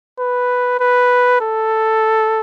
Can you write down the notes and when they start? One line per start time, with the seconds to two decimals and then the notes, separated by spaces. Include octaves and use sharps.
0.19 B4
0.80 B4
1.41 A4